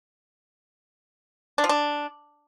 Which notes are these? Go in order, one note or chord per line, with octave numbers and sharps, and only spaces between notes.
D4
F3
D4